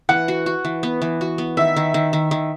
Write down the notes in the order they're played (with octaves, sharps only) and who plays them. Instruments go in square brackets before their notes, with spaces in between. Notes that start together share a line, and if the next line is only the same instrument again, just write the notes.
[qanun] E3 [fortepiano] F#5
[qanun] F#4
F#4
E3
B3
E3
F#4
B3
[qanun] D#3 [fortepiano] E5
[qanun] D#3
D#3
D#3
D#3